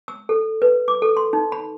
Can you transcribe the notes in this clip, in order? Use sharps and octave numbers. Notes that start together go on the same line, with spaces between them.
E6
A4
B4
D6
A4
C6
D#4
B5